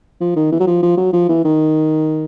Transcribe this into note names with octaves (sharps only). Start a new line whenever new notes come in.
F3
D#3
E3
F#3
F3
F3
F#3
F3
E3
D#3